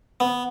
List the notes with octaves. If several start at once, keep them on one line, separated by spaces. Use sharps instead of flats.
B3